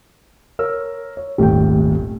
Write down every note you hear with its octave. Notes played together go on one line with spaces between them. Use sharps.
A#4 C#5 E6
C#5
D#1 G#1 D#3 A3 G4 G5